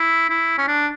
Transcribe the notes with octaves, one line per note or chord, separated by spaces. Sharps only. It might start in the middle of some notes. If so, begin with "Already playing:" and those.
Already playing: E4
E4
C#4
D4